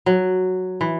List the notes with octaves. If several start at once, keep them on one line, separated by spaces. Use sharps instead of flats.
F#3
E3